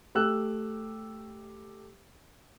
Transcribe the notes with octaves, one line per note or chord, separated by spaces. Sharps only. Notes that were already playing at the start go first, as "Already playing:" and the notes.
A3 G4 E6 F#6